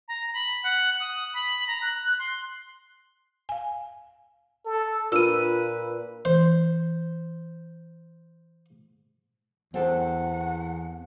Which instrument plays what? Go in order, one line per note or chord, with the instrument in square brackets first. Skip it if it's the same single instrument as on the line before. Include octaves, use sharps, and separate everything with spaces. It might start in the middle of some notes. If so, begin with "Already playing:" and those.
[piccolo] A#5
B5
F#5
D#6
B5
A#5
F#6
C6
[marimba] F5 G#5
[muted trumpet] A4
[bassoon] A#2 [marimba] D4 F4 [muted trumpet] B4 [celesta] E6 D#7
[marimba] E3 [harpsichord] C5
[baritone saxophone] E2 [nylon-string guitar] C4 A4 [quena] F#5